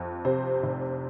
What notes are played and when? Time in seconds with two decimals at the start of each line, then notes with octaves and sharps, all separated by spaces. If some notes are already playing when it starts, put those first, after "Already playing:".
Already playing: F2
0.25 C3 C5
0.63 F1